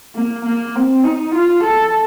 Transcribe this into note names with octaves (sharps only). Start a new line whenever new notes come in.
A#3
A#3
C4
D#4
F4
A4